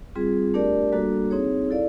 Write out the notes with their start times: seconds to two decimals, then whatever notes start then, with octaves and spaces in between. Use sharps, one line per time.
0.15 G3 C4 F4 G#4
0.54 A3 D4 G4 A#4 D5
0.92 G3 A#3 D4 F#4 A4
1.31 C4 D#4 G#4 C#5
1.69 E4 A4 D5 F5